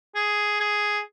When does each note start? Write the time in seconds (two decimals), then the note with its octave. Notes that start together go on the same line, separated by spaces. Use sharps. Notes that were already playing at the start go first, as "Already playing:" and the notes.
0.15 G#4
0.60 G#4